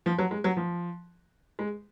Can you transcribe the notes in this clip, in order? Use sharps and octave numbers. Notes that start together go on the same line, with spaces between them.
F3
F#3
G#3
F#3
F3
G#3